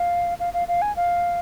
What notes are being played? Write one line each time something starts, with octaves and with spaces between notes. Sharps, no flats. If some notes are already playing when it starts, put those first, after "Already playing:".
Already playing: F5
F5
F5
F5
G#5
F5